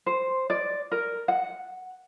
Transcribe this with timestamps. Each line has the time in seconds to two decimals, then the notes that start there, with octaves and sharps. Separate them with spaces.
0.06 C5
0.50 D5
0.91 A#4
1.28 F#5